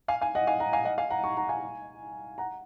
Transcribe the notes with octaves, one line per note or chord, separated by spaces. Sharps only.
F5 G#5
F5 G#5
D#5 F#5
F5 G#5
F#5 A#5
F5 G#5
D#5 F#5
F5 G#5
F#5 A#5
A#5 C#6
F#5 A#5
F5 G#5
F#5 A#5